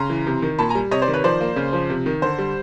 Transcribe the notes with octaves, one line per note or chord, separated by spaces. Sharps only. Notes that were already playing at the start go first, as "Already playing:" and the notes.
Already playing: C#3 A#5 C6
E3
C3
D#3
A#2 A5 B5
G#5 A#5
G3
C3 C#5 D#5
C5 D5
D#3
B4 C#5
F3 C5 D5
A#3
C#3
F3
C3
D#3
D3 C5
G3